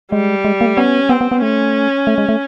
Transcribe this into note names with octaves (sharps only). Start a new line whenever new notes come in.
G3 G#3
G#3
A#3
A3
B3 C#4
B3 C4
B3
B3
A3 C#4
A3
G#3
A3